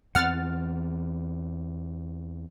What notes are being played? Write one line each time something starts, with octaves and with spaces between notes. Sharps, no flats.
E2 E3 C4 F#5 F6 A6